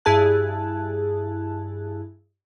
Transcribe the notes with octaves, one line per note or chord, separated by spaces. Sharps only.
G2 E4 G#4 A5 F#6